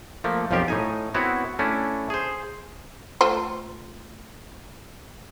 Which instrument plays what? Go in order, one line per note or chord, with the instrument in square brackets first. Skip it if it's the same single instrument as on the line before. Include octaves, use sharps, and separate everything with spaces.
[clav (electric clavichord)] F3 A3 A#3
B1 F2 F3 F4 G4 A#4
A2 D#4 G#5
B3 C4 E4 F#4 C#5
A3 C#4 D4 E4
G#4 C5
[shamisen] A3 F4 C5